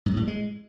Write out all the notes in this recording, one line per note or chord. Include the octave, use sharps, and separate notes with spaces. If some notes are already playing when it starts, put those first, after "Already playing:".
G#2
F#2
A2
G3
G#3